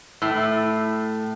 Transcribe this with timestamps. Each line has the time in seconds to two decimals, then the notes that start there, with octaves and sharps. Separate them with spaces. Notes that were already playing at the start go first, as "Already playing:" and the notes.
0.22 A2